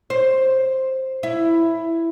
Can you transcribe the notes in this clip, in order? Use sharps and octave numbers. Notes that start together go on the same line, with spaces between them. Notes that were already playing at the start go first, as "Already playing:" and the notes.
C5
E4